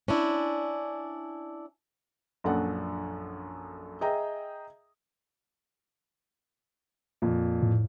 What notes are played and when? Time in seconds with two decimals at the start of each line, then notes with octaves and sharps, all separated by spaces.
0.08 C#4 D4 E4
2.44 A#1 F#2 D4 A4 F#5
4.01 G#4 D#5 E5 G5 A#5
7.22 F2 A#2
7.62 A2